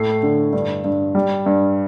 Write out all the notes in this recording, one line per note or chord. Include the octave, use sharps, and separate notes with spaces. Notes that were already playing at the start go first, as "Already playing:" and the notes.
Already playing: A2 A3 C7
D3
G2
G2
G3
G2